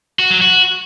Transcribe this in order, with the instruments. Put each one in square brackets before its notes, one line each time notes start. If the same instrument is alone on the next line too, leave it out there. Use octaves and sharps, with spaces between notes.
[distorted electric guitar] F#4
F#3
F#4